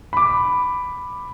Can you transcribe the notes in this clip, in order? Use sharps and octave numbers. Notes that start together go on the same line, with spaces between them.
B5 D6